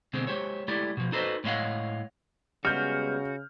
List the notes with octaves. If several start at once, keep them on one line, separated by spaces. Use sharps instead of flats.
B2 D3 G#3 C4
G#3 G4 C5 C#5
G#3 A3 E4 G4 D5
B2 F3
D#4 F#4 A4 B4 C5 D#5
A2 G#3 C#5 D#5 F5 F#5
C#3 G3 G#3 B3 F#4 F6 G6